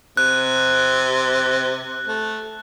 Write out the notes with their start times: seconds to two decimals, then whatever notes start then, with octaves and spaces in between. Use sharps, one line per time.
0.17 C3 F#6
2.08 A3